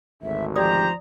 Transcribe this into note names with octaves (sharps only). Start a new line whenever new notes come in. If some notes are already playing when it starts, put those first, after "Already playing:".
G#1 D2 E5
F3 G4 C5 D5 A#5 D#6